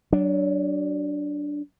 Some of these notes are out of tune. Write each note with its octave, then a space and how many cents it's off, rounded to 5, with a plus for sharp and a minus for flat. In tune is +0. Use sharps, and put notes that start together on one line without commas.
F#3 +30 D4 +0